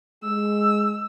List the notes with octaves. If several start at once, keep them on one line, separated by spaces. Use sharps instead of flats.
G#3 E6